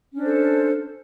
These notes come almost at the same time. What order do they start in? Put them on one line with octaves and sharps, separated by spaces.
C#4 D4 C5 A4